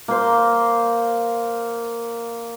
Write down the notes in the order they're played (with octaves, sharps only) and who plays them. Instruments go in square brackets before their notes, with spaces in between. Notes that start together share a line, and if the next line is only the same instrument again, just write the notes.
[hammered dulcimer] A#3 C5